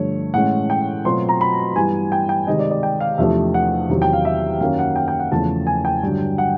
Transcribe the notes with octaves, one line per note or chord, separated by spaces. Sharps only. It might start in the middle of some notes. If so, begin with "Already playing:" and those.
Already playing: G2 D3 F3 A3 C#5
A2 E3 G#3 C#4 F#5
G5
B2 F#3 A3 C4 F4 C6
A#5
B5
G2 E3 G3 B3 G#5
G5
G5
C3 D#3 G#3 D#5
D5
D5
G5
F5
E2 C3 F3 A3 D4 E5
F#5
E2 C3 D#3 F#3
G5
F5
E5
F#2 D#3 F#3 A#3 C#4 F5
F#5
G5
G5
F#5
E2 C#3 F3 A3 A5
G#5
G5
G2 D3 F#3
F#5